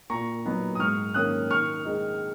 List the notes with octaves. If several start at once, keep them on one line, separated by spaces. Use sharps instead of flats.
A#2 A#5 C#6
F#3 B3 D#4
D#6
G#2 C#6 F6
D#3 A#3 C#4 D#6 F#6
D#3 C#6 F6
G#3 D#4